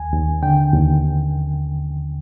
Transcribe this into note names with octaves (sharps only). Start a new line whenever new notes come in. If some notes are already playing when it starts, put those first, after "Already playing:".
Already playing: D#2 G#5
D#2
D3 G5
D#2